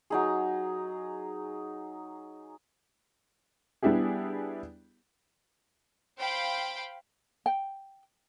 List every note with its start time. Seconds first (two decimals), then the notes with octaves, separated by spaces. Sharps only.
0.10 F#3 D#4 G#4
3.83 G3 B3 D4 E4 G4 G#4
6.19 C5 F5 G5 B5
7.46 G5